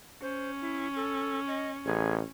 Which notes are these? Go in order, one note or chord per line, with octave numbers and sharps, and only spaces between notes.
C#4 C5
E4
A4
D#5
A1 G#4